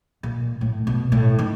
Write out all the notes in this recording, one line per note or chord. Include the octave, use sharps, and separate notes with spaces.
A#2
A2
B2
A2
D#3